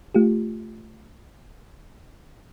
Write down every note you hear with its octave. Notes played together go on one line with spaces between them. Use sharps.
A3 F4 G4